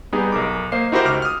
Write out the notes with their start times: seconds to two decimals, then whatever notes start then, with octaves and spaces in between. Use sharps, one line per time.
0.12 G3 B3 D#4 G4 G#4
0.32 B1 A#4 D6
0.72 A#3 C5 D#5 F5 C7
0.92 D#4 E4 F#4 G4 A#4 C5
1.05 C#2 D6 F6
1.22 D#6 F6